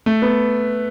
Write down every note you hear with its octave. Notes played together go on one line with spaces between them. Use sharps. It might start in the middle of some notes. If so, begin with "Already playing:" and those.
A3
B3